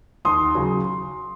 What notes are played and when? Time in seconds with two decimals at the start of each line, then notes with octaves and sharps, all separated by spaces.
0.25 D#2 C6 D#6
0.55 C#3 F#3